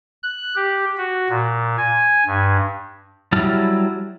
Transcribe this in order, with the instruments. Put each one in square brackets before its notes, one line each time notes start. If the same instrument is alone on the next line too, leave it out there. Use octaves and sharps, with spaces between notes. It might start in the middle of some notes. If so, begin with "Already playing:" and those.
[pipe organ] F#6
G4
F#4
A#2
G#5
G2
[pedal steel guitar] F#3 G3 E4 A5 F6